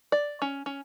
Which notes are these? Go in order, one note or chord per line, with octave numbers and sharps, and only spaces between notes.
D5
C#4
C#4